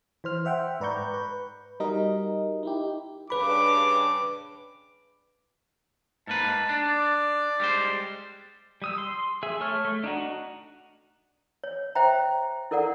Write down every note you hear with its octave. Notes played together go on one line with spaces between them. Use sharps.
E3 C5 F6
C5 E5 F#5 G5
G#2 B4 D5 A#5 C#6 G6
B4
G3 D#4 F#4 A#4 D#5
D#4 E4 G4
G2 C#3 D4 B4 B5 D6
G#2 A#3 B4 A5
D4
D5
G3 G#3 C5
G3 D#6 E6
C6
G#4 E5
A3 A4 C#5 C#6 F6
A3
D4 D#4 F#4
C#5
C5 E5 G5 A#5
E4 A4 A#4 D5 F#5